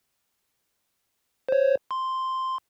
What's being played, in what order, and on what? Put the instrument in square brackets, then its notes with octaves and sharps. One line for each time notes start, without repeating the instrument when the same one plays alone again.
[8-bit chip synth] C5 C#5
C6